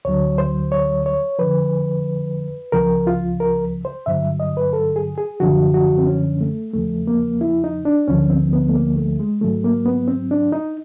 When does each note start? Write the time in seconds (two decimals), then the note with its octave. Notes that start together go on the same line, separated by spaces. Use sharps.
0.05 D2 D3 F#3 C#5
0.38 C5
0.72 C#5
1.06 C#5
1.39 F2 D3 F3 B4
2.72 C#2 C#3 F3 A#4
3.07 F4
3.40 A#4
3.85 C5
4.06 G2 D3 F#3 E5
4.40 D#5
4.57 B4
4.73 A4
4.96 G#4
5.18 G#4
5.40 F#2 D3 F3 F#4
5.74 F#4
5.98 C4
6.07 C#4
6.41 A3
6.74 E2 C#3 F3 A3
7.07 A#3
7.41 E4
7.64 D#4
7.85 D4
8.08 D2 D3 F3 C#4
8.30 C4
8.53 B3
8.69 A3
8.74 A#3
8.97 A3
9.20 G#3
9.41 G#2 D#3 F#3 A3
9.64 A#3
9.86 B3
10.08 C4
10.31 D4
10.52 D#4